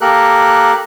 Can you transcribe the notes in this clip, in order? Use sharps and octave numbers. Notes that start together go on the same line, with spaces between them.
A#3 G4 A4 A#4 F#6